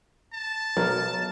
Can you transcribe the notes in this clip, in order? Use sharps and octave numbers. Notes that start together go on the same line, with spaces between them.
A5
B1 F#3 A#4